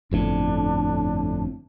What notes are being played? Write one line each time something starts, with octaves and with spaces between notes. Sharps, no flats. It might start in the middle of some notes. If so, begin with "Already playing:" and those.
G1 F2 A2 D4